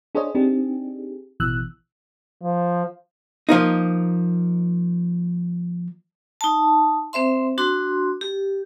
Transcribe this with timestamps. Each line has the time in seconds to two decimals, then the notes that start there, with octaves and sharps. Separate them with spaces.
0.15 D4 G#4 C5 C#5 D#5
0.35 C4 D4 D#4 G4 G#4
1.40 A1 B2 E3 E6 F#6
2.43 F3
3.49 F3 A#3 D#4
6.41 D#4 A5
7.13 C4 C5 E5 C6
7.58 D4 F#4 C6
8.21 G4